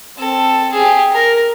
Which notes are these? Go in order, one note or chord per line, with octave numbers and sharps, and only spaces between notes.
C4 A4
G4 G#4
A#4